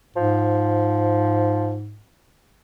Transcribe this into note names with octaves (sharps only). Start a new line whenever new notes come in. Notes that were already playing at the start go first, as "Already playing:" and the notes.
G#2 F3